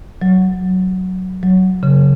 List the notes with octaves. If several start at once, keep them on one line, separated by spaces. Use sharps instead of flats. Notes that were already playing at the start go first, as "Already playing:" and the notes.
F#3
F#3
C#3